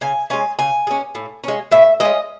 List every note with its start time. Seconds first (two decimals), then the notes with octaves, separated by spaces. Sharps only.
0.01 C#3 G#5
0.30 G#3 C#4 G#5
0.59 C#3 G#5
0.87 G#3 C#4
1.15 A2
1.44 G#3 C#4
1.71 A2 E5
2.00 G#3 C#4 D#5